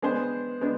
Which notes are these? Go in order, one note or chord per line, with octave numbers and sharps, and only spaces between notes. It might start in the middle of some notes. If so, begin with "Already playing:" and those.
G#3 B3 D4 G#4 C5
G#3 B3 D4